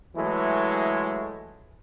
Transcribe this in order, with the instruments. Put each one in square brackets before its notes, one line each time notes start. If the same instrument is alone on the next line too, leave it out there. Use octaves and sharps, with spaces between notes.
[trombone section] E3 F#3 G#3 A3 E4